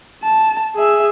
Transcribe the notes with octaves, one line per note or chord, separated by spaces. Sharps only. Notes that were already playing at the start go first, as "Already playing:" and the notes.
A5
G#4 E5